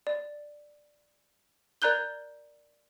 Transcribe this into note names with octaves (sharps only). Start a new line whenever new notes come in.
D5
A#4 D5 A#5 F#6 G6 G7